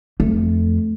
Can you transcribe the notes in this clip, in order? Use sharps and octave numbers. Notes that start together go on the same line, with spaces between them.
F2 A3